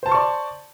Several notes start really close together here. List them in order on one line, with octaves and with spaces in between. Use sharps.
C5 A5 C6 C#6 D5